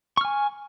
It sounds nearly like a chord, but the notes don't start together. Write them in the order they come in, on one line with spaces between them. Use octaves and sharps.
C#6 F6 G#5